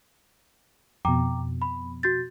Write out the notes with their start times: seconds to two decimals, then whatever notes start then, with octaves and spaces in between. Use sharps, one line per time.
1.05 F2 B2 G5 A#5 D6
1.62 B5
2.03 F#4 G6 A6